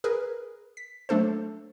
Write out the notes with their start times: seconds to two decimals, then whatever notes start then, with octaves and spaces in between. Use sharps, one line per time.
0.04 G#4 A#4 B4
0.77 B6
1.09 F#3 A3 D4 A4 C5